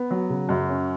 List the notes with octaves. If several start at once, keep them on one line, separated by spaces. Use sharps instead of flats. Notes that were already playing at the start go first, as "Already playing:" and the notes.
Already playing: B3
F#3
C#3
F#2
C#4